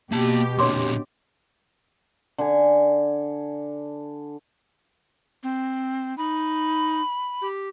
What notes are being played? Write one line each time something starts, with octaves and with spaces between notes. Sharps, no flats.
B2 A#3 G4 A5
A#2 D3 C#5 C6 D6
D3 G#5
C4
D#4 B5
G4